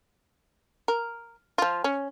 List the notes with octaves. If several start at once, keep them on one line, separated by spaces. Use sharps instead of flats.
A#4
F3 F4
C#4